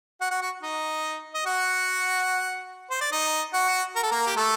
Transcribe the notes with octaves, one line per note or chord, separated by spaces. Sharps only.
F#4 F#5
F#4 F#5
F#4 F#5
D#4 D#5
D#5
F#4 F#5
C5
D5
D#4 D#5
F#4 F#5
A#4
A4
A#3 A#4
G4
A3 A4